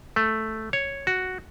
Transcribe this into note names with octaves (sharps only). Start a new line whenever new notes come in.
A3
C#5
F#4